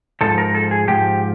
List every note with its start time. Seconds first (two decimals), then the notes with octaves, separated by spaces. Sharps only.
0.21 G#2 F3 A4
0.38 A#4
0.55 A4
0.71 G#4
0.88 G#2 F3 G4